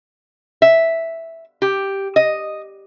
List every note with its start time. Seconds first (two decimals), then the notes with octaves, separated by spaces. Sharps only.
0.62 E5
1.62 G4
2.16 D#5